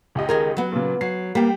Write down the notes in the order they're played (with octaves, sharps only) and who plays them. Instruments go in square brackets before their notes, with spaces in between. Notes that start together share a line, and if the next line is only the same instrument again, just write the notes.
[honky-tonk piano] C#2 G4 D#5
[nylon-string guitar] D#3 G#4 A#4
F#3 B3
[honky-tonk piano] A#2 C#3
[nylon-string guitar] F#3 [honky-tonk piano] C7
[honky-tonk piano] G3 G5 [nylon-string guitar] A#3 B3